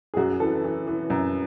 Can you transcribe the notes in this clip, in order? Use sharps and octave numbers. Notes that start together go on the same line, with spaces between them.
G#4
F#2 F#4
E3 A4
E3
E3
F#2